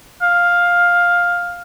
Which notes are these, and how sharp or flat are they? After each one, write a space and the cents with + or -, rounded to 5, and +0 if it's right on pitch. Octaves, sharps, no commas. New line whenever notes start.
F5 +5